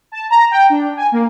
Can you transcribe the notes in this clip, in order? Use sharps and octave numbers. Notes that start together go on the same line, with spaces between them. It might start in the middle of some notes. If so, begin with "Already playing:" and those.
A5
A#5
G5
D4
G#5
A#3